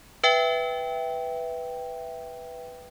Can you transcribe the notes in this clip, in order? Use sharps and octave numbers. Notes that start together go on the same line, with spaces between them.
B4 E5 G5